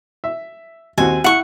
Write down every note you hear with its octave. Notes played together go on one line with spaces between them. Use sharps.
E5
D#2 C4 F#4 G#5
E4 F#5 C#6